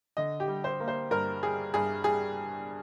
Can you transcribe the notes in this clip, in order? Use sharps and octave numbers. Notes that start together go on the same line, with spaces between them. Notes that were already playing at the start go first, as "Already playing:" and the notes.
D3 D#5
G4
G3
C5
A#3
C5
G2 A#4
G3 G#4
G2 G#4
G3 G#4